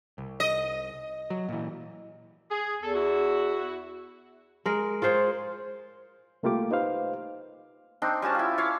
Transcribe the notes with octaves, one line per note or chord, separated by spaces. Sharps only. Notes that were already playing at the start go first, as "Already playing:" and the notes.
C2
D#5
F#3
A#2 E3
G#4
E2 A4
E4 F#4
G#3 A#4
F4 G#4 C5 C#5
C2 A3 A#3 F4 G4 D6
D#4 B4 C5 F5
C4 D4 D#4
G3 C#4 F#4 A5
E4 F4
C#5 F5 D6